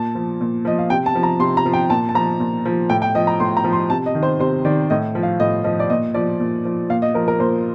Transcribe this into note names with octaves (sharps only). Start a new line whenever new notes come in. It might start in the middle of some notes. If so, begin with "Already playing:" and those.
Already playing: A#2 A5
F3
A#2
F3 D#5
F5
C3 G5
A5
F3
A#5
C3 C6
A#5
F3
G5
A#2 A5
A5
F3 A#5
A#2
F3
A2 G5
G5
F3 D#5
A#5
A2 C6
A#5
F3
C6
C3 A5
D#5
D#3
C5
C3 C5
D#3 D5
A2 D#5
F3
F5
A2 D#5
F3 D#5
D5
A#2 D#5
F3 D5
A#2
F3
A#2 F5
D#5
F3 A#4
A#4
A#2 C5